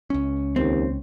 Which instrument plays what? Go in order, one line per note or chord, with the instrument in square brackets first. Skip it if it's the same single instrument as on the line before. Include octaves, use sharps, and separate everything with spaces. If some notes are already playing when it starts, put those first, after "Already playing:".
[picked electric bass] C#2 C#4
[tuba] D#2 [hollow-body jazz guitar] C4